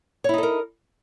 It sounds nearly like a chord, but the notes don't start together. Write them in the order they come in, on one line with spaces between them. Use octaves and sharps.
C#5 E4 D#4 A4 A#4